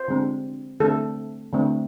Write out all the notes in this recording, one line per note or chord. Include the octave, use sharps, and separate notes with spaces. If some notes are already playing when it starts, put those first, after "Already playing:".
Already playing: C5
D3 G#3 C4
D3 A3 C4 A4
D3 A3 C4